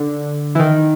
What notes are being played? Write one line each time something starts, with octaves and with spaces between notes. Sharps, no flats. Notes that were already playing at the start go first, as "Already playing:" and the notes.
Already playing: D3
E3
D#3